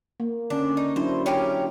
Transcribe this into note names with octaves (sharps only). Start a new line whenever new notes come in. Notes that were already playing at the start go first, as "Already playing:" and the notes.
A#3
D3 C#4 D4
D#4
F#3 D4 E4 C5
C#4 G4 A#4